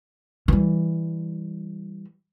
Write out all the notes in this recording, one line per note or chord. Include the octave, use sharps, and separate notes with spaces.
E3 G3